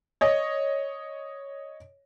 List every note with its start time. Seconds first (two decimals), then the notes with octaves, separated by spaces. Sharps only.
0.21 C#5 D#5